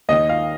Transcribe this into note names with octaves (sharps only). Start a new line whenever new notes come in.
D#2 D#3 D#5
F5